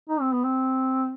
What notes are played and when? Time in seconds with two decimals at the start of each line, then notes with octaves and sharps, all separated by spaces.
0.09 D#4
0.21 C4
0.32 B3
0.44 C4